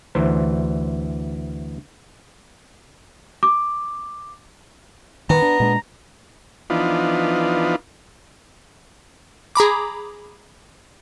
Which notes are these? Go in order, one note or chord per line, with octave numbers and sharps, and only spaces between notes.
D2 E3 C5 A#5
D6
D#3 B3 A#5
D4
A#2 G#3 D4
E3 F3 B3 D4 D#4 F4
G#4 A#5 B5 D6